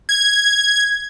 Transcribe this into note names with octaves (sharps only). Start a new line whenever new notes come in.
G#6